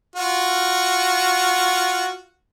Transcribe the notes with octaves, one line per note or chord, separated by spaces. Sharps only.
F4 F#4